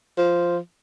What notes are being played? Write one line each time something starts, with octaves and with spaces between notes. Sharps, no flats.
F3